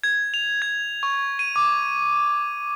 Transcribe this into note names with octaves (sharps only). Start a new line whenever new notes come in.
G#6
F7
G#6
C#6
D#7
D6